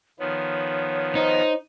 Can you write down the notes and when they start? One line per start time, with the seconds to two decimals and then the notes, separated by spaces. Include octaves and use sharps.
0.19 D#3 F3 B3 C#5
1.15 D#4 C5